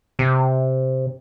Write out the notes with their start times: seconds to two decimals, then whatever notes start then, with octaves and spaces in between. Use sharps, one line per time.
0.19 C3